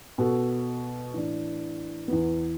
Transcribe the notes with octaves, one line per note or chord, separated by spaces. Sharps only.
B2 B3 F#4 A4
A2 E3 D4
E2 E3 B3